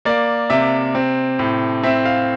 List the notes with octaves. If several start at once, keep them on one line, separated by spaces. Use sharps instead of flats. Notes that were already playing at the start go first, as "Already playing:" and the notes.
A#3 D5
C3 E5
C4
A2
C4 E5
F5